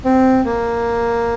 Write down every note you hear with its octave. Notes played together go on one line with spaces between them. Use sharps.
C4
A#3